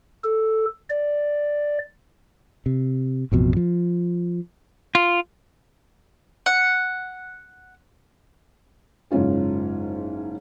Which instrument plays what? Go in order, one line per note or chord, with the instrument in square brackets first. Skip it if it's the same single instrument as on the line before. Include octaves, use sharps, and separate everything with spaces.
[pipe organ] A4
D5
[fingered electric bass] C3
A1 F2 B2
F3
[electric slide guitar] F4
[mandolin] F#5
[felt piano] F#1 G#2 C#4 F4 G#4